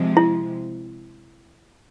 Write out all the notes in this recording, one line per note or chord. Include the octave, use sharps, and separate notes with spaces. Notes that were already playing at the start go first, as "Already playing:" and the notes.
Already playing: C3 F3 G#3
E4